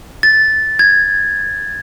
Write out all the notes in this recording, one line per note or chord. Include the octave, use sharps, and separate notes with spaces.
A6
G#6